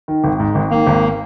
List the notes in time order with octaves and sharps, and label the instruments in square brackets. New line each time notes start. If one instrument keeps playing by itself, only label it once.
[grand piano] D#3
G#1
G#2
G#1
[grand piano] D#3 [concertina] A#3
[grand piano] G#1